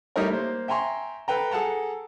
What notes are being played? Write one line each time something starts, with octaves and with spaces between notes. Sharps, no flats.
G3 A3 D#4 E4 A#4 C#5
A#3 C5
E5 G5 G#5 A#5 C6 C#6
A4 B4 G5 A#5
G#4 A4 F#5 A5 A#5